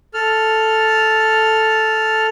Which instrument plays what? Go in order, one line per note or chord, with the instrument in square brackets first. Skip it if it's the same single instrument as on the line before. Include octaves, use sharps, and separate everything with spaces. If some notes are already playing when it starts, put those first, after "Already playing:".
[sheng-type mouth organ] A4 F6